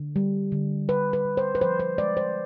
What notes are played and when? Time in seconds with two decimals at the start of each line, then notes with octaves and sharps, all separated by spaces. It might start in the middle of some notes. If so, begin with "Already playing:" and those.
Already playing: D3
0.16 G3
0.52 D3
0.88 D3 B4
1.13 B4
1.25 D3
1.37 C5
1.55 B4
1.61 F3 C5
1.80 C5
1.98 G#3 D5
2.17 C5